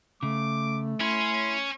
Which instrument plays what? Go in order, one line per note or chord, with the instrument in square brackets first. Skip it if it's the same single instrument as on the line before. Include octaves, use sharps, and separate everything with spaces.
[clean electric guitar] C#3 [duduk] A3 [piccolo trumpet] D6
[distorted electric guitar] C#4 [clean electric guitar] E4 [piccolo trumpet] C6